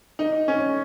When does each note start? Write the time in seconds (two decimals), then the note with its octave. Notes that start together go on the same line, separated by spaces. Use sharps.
0.19 D#4
0.48 C#4